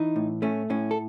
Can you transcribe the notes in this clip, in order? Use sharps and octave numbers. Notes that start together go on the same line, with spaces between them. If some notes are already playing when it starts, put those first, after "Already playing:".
Already playing: E3 D#4
A2
A3 C#4
A2 C#4
A4